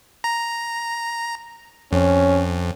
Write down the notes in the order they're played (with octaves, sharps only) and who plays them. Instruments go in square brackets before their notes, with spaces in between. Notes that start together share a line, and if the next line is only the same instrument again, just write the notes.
[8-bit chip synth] A#5
[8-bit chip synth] F2 [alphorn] C#4